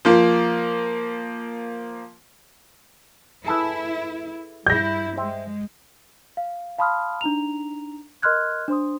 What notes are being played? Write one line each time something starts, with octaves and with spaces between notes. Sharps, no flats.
F3 A#3
E4 G#4 A4 B4
G2 E4 G6 A#6
G#3 C5 E5 G5
F5
F5 A5 B5 C6 D#6 F6
D4 D#4 A#5 F7
A#4 D#5 C6 F6 F#6 G#6
D4 C5 C6 D#6